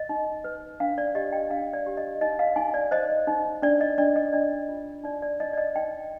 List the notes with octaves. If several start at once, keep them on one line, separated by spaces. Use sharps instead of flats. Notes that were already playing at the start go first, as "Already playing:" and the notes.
Already playing: D#5
D#4
B4
D4 F5
D5
G4 D#5
G5
D4 F5
D5
G4
D#5
D#4 D#5
F5
D#4 G#5
D5
C5 D#5
D#4
D4 D5
D#5
D4 D5
D#5
D4 D5
F4
D#4 D5
D5
D#4 D#5
D5
D#5
D#4 G5